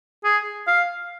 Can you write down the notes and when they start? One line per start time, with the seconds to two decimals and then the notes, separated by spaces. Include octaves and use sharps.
0.25 G#4
0.68 F5